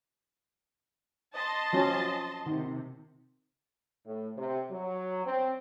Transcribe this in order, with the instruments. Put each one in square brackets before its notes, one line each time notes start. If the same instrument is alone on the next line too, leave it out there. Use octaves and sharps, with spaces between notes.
[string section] D#5 A5 C6
[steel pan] F3 F#3 C#4
[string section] C3 [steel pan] D#3
[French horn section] A2
C3
F#3
C4